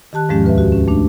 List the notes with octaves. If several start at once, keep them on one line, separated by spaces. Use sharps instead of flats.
D#3 G4 A5 F#6
E2 G#2 F3 G#3 C#4 G4
D2 B4 E5
F#4 G4
C#4
A3 D4